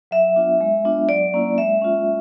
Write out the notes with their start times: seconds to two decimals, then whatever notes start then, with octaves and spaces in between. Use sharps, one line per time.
0.11 F#3 E5
0.36 B3 D4 F4
0.61 G#3
0.85 B3 D4 F4
1.09 F#3 D5
1.34 A#3 C#4 E4
1.58 G#3 E5
1.82 C#4 F4